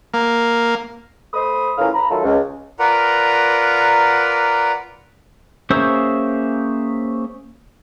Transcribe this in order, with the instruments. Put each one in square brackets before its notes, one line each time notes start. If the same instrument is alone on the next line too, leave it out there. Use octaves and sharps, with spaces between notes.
[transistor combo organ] A#3
[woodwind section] A3 C5 B5 D#6
A2 E3 C#4 F4 A#4 F5
A#5 B5
D#3 F#3 A3 F4 A4
C#2
[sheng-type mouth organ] F4 A#4 B4 D5 F#5 A#5
[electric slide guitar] A#3 C#4 G#4 C5 C#5 E5